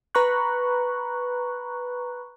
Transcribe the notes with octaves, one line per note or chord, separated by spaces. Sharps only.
B4 A#5 B5 C#6 F#6